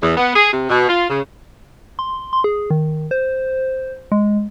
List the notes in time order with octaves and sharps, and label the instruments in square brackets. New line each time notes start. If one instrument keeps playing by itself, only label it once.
[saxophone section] E2
B3
G#4
C3
B2
F4
C#3
[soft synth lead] C6
C6
G#4
D#3
C5
G#3